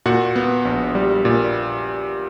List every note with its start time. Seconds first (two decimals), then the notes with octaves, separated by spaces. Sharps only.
0.06 A#2 F#4 F#5
0.36 B3
0.65 A#1
0.95 G3
1.25 A#2